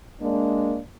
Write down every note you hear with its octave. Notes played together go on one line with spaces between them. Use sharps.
G#3 A#3 D4